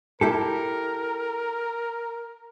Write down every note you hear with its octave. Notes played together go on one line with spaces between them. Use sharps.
E4 G4 A4 A#4